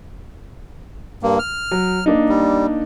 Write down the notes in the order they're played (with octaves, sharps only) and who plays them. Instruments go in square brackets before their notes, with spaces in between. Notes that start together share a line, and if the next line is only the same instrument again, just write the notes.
[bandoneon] G2 A#3
F6
[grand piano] F#3
A#3 D4 D#4
[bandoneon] G3